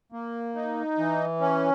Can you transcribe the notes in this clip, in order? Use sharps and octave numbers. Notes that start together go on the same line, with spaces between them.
A#3
D#4
E3
C#4